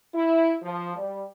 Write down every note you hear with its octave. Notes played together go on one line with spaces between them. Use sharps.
E4
F3
G3